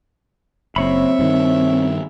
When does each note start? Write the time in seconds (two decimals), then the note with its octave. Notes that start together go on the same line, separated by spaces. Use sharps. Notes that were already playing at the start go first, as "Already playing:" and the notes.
0.76 F#1 C4 C#5 E5 B5
1.19 G2 D#3